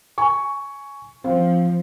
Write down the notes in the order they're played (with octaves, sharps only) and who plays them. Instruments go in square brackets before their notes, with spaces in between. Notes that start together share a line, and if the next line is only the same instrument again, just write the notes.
[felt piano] G#5 C#6
[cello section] F3 [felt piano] C4 C5 F5